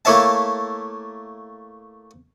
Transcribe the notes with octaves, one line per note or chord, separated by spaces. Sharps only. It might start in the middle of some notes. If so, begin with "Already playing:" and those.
A3 A#3 E4 C#5 E5 A5